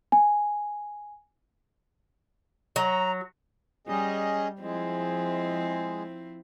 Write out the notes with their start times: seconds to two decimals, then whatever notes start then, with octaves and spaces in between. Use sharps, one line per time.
0.12 G#5
2.76 F#3 A#5
3.87 G3 C#4 G#4 D#5
4.60 F3 G#3 C4 E4